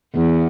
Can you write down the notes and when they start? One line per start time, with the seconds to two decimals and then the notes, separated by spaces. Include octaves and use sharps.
0.16 E2